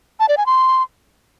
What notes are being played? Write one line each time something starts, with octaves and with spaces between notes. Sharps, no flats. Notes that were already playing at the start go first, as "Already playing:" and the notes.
A5
D5
G#5
C6